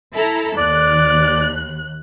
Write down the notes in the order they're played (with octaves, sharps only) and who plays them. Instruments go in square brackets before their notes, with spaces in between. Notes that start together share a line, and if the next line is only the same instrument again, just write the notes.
[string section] E4 A4 A#5
[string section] D#2 F#6 [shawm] D5